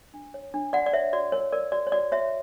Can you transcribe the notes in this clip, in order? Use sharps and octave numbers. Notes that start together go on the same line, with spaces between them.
D4
C#5
D4
F#4 D5 F#5
D5
C#5 E5
F#4 D5
A#4 C#5
A#4 D5
F#4 D5
C#5
F#4 D5
F#4 C#5 E5